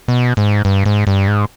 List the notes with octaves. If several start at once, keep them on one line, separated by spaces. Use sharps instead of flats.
B2
G#2
G2
G#2
G2
G#2